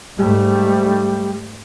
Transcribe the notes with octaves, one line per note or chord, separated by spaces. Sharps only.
G#2 G3 A3